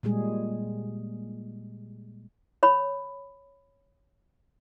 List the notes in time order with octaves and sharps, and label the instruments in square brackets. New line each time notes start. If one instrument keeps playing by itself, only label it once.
[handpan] A#2 G3 G#3 G#4
[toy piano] C#5 B5